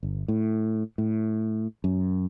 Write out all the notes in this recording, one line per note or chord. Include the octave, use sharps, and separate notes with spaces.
G1
A2
A2
F#2